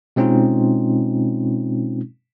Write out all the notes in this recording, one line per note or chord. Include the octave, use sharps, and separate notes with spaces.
B2 G#3 C4 C#4 D#4 F4